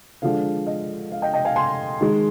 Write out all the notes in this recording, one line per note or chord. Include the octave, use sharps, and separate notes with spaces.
D3 F3 G#3 F5
D#5
F5
D#5 G5
D#5 G5
F5 G#5
G#5 C6
D#3 G#3